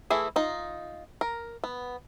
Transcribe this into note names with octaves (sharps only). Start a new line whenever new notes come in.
E3 A3 E4 G#4
D#4 F4
A#4
B3